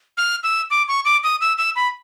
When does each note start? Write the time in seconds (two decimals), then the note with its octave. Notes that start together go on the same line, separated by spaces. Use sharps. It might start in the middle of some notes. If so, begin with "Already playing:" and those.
0.17 F6
0.43 E6
0.70 D6
0.88 C#6
1.05 D6
1.24 D#6
1.41 E6
1.58 E6
1.76 B5